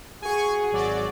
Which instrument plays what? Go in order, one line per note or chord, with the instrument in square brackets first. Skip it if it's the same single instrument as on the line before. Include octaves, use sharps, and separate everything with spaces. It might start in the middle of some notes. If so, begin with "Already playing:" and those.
[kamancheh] F#4 G#4 [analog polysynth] G#5 C#6
[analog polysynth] G#1 F#3 D5